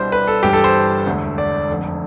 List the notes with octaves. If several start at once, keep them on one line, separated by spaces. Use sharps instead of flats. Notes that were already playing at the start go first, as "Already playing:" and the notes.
Already playing: C2 B2 G3 D4 C5
B4
A4
G1 G2 E3 G4
A4
C5
E1 D2 D3 A3
D5
F1 F2 D3